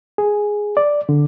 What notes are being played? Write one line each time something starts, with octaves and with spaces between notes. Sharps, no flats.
G#4
D5
D3